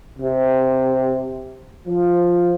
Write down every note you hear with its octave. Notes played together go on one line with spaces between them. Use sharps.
C3
F3